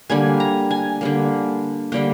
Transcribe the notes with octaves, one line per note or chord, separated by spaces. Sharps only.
D3 G3 A#3 G#5
A#5
G#5
D3 G3 A#3
D3 G3 A#3 G5